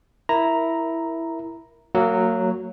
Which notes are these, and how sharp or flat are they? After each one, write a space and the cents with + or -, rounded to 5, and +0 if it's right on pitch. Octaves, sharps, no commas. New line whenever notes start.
E4 +0 A#4 +0 A#5 +0
F#3 +0 A#3 -30